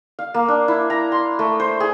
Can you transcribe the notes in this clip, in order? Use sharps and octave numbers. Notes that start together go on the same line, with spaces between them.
F5
A#3
D4
E4
A#5
C6
A3
C5
G#4